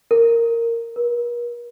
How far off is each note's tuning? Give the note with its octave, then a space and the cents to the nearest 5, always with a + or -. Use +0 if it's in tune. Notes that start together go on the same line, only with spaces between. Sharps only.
A#4 -10
A#4 +45